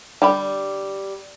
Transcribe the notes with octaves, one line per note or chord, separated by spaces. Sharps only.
D3 G3 G4 B5